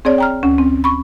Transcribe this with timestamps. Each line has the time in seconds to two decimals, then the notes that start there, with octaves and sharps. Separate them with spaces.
0.05 C4 G#4 C#5 D5
0.18 G5 A#5 F6
0.43 D2 C#4
0.58 C4
0.84 B5 C#6